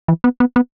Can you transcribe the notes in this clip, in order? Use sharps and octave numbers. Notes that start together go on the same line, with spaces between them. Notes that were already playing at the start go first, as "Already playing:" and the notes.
E3
B3
B3
B3